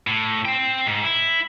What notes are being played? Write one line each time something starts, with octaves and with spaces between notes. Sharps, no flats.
A2
C5 G5
G#2
E4